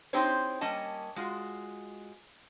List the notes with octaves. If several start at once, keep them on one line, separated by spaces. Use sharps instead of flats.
C4 D#4 E4 G4 C5 C#5
G3 A#3 C#4 D#5 A5
G#3 F4 F#4